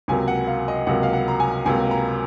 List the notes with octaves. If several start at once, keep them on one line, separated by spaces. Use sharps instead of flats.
C#2 C3 F#3 A#3 G#5
F#5
F5
D#5
C#2 C3 F#3 A#3 F#5
F5
F#5
A#5
G#5
C#2 C3 F#3 A#3 G#5
A#5